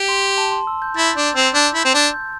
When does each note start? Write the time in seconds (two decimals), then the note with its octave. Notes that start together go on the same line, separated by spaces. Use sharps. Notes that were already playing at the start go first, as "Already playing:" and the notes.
Already playing: G4
0.08 C6
0.38 A5
0.52 C6
0.67 E6
0.82 G6
0.96 E4 A6
1.16 D4 G6
1.35 C4 E6
1.54 D4 G6
1.74 E4
1.84 C4 G6
1.94 D4
2.14 G6